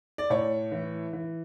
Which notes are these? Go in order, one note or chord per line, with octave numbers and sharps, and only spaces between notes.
D5
A2 C#5
E3
E3